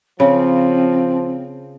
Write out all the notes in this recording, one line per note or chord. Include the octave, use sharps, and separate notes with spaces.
C#3 F3 C4